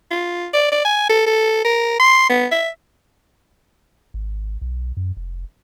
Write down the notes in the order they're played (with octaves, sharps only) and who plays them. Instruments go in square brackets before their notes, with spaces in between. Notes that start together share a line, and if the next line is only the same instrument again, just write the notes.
[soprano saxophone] F4
D5
D5
G#5
A4
A4
A#4
C6
B3
E5
[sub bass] G#1
B1
F#2
F1